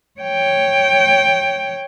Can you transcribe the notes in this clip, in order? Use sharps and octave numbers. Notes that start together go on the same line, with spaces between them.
C#5 G5